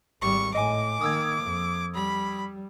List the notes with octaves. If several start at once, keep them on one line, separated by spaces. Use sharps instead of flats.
G#1 G3 C#6
A2 D#5 G#5 D6
D#3 A#3 D#6 E6 G#6
F2
G3 B5